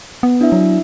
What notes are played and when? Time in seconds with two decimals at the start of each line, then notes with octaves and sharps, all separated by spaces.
0.23 B3
0.41 D4 E4 E5
0.52 F#3